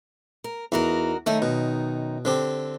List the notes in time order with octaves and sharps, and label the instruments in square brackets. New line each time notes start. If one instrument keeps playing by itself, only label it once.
[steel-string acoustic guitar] A#4
[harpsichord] E2 [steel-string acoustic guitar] D#4 F#4 A#4
[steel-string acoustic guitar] F#2 D#3 D#4 [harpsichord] A3
[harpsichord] B2
D3 C4 G4